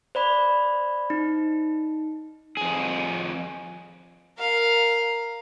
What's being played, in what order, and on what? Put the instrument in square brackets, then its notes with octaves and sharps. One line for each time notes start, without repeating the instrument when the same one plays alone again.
[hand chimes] C5 D5 B5
D#4
[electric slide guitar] F2 G#4
[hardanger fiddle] A#4 F5